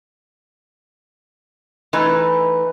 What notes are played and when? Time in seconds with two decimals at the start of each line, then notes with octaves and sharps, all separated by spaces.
1.93 E3 A3 D#4 B4